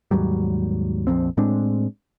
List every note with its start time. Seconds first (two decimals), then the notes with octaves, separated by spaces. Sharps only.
0.11 D#2 G#2 F#3 G3
1.07 A#1 F2 C4
1.37 A2 G#3 C4 D4